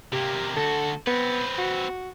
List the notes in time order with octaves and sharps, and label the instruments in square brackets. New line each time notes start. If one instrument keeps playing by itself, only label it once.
[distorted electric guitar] C3 A#3 [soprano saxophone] G4
[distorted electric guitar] D2 F#4 [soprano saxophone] A4
[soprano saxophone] B3 [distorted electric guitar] C4 B4
[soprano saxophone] F#4